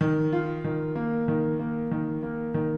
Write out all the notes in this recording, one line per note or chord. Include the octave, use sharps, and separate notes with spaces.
D#3
F4
D#3
A#3
D#3
A#3
D#3
A#3
D#3